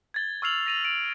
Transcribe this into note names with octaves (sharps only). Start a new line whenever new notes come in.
G#6 A6 G7
C#6 E6 F6 C7 F7 F#7
A#6 D#7 F7
D7